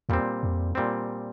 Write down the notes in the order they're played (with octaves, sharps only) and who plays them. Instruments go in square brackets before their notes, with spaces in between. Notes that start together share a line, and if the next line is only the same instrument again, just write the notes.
[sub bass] E2 [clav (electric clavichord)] A#2 G3 C4
[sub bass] F2
[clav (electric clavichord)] A#2 G3 C4